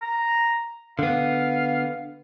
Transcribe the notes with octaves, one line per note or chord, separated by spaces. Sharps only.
A#5
D3 B3 F5